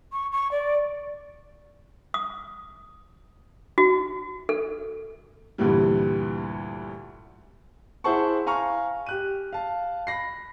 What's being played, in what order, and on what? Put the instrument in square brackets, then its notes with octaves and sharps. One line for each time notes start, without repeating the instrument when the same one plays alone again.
[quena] C#6
C#6
D5
[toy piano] D#6
F#4
A4
[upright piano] D2 G2 A#2 E3 G3
[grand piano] E4 G#4 C5 F#5 A5 C#6
F5 G#5 A#5 C#6 F6
G4 F#6 D#7
F5 A5
B5 A#6 C7